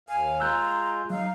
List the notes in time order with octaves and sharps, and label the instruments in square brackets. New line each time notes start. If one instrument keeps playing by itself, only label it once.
[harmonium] D#2 F5 [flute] G#5
[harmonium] G#3 F4 [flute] A#5 [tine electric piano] E6 F#6 G6
[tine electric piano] F#3 [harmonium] D#4 [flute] F5